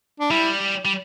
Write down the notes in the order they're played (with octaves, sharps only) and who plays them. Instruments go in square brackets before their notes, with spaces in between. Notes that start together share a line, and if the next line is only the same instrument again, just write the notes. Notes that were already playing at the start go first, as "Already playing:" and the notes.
[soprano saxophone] D4
[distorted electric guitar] G3 [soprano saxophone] E4
[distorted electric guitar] G3